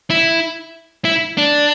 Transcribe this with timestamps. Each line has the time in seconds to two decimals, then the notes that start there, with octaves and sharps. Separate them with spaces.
0.10 E4
1.05 E4
1.38 D4